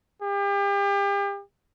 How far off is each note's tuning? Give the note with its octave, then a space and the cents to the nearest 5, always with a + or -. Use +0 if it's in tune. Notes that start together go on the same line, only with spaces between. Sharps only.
G4 +35